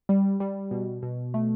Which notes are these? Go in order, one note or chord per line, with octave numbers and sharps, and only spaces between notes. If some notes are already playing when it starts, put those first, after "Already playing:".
G3
G3
B2
B2
A3